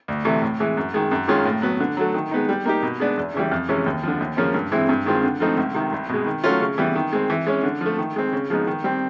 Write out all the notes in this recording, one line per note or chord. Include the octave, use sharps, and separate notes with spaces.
D2
C3 E3 A3
A2
E3 G#3
F#2
D#3 G#3
F#2
D#3 G#3 C#4 F4
A2
F#3 B3
D3
F#3 A3
D#3
G#3 B3 D#4
G3
A#3 D#4 G4
B2
G#3 B3 D4
E2
C#3 E3 G3
F2
C3 E3 G#3 C#4
D#2
D3 F3
D#2
C#3 F3 A#3 C#4
G2
E3 G#3 C4 E4
G2
D#3 G#3 C4 F4
D3
F3 A3 C4 D#4
C#2
C3 D#3
C2
B2 G#3
D#3
F#3 A3 C#4 F4
C#3
E3 G3 B3
D#3
G#3 C4
E3
G#3 C#4
D3
F3 A3
D#3
G#3 C4
C#3
F3 G#3 B3 D#4
D#3
G3 C4